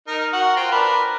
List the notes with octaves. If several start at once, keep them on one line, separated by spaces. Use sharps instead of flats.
D#4 A#4
F#4 A#4 F#5
F4 C5 G5
D4 A#4 B4